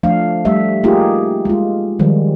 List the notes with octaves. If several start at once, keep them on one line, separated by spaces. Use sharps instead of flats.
F3 A3 D4 F5
G3 A3 E5
A3 A#3 D#4 F4 G4 G#4
G#3 F4
D#3 F3 G3 G#3